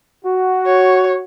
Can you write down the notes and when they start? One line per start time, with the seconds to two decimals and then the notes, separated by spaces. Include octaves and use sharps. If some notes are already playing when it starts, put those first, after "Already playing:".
0.25 F#4
0.66 C#5